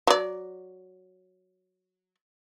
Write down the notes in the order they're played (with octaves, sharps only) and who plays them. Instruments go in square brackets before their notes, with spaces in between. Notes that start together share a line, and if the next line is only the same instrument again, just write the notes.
[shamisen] F#3 D5